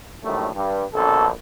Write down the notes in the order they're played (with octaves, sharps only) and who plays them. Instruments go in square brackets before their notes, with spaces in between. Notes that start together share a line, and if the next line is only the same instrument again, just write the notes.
[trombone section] A#1 F#2 A2 D#3 G3 A3
G2
A#1 B2 D3 C#4 A4